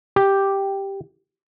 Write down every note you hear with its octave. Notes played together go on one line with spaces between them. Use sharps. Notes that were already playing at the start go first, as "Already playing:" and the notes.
G4